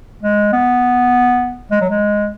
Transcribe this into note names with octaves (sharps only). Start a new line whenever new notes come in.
G#3
B3
G#3
F#3
G#3